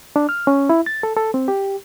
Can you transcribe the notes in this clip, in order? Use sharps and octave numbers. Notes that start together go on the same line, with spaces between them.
D4
F6
C#4
E4
A6
A4
A4
C4
G4